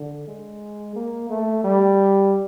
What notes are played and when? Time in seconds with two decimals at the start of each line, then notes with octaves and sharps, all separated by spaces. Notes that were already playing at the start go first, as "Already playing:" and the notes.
Already playing: D3
0.27 G#3
0.96 A#3
1.30 A3
1.64 G3